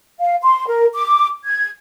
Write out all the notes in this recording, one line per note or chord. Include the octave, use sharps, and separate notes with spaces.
F5
C6
A#4
D6
G#6